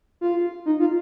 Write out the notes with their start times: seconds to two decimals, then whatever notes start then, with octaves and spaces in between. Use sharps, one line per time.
0.21 F4
0.66 D#4
0.80 F4